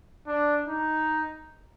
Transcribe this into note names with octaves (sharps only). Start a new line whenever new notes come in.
D4
D#4